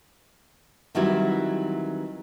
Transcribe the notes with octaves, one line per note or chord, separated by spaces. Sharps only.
D#3 E3 F#3 G3 C4 E4